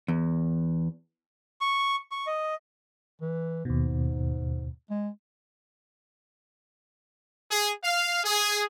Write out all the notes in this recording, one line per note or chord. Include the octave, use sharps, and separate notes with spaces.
E2
C#6
C#6
D#5
E3
D#2 G#2 B2
G#3
G#4
F5
G#4